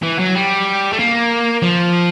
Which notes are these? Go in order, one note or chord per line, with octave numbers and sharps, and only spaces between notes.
E3
F#3
G3
A3
A#3
F3